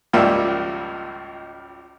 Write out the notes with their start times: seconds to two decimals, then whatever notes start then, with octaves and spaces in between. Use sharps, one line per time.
0.13 G#1 C#2 F3 G3 A#3 E5